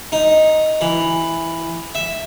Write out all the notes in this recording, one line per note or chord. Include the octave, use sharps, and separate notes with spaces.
D#4
E3
E5